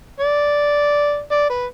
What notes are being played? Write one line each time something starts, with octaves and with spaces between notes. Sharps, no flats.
D5
D5
B4